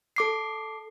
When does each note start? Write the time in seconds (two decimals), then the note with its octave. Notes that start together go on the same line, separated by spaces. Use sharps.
0.16 A4 D6 C7